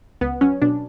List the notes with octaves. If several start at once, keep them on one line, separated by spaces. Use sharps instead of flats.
C#2 B3
F#3 C#4
B2 D4